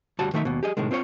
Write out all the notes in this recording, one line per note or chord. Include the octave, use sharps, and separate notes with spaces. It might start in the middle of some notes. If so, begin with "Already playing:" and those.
D2 G3 F#4 C#5 A5
D#3 A3 D#4 E5
D#2 B2
G4 G#4 D#5
A2 C3 D#3 G#3
C4 F4 C5 C#5